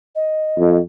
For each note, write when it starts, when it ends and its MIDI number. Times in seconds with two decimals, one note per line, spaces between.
0.16 0.80 75
0.58 0.79 41